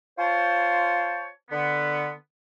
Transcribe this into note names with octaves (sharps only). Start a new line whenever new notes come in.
F4 C5 C#5 A5
D3 B3